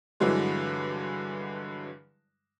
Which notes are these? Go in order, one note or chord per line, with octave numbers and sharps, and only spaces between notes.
G2 D3 E3 F#3 G#3